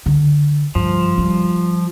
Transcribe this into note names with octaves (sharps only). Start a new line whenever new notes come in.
D3
G2 F3
G3